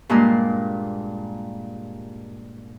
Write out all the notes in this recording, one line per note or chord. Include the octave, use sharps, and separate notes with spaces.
G2 A#2 G#3 A#3 D4 A#4